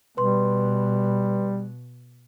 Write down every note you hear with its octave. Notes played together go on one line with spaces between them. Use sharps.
B2 G3 B4 C6